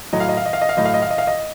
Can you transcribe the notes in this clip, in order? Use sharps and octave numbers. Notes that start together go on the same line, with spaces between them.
A2 F#3 D#5
F5
D#5
F5
D#5
F5
D#5
F5
A2 F#3 D#5
F5
D#5
F5
D#5
F5
D#5